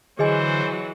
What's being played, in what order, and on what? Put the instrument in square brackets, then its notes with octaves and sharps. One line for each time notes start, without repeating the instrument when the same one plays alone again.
[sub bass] D3 [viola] E3 F#3 [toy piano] G#4 D#5 G#5 [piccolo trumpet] C5